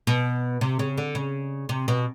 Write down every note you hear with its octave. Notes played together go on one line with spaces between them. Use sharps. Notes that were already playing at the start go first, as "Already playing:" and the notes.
B2
C3
C#3
D3
C#3
C3
B2